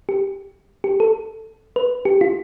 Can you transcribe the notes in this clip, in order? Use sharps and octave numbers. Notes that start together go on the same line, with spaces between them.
G4
G4
A4
B4
G4
F4